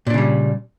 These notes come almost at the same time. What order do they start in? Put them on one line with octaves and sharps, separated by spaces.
A#2 D4 C#3 G3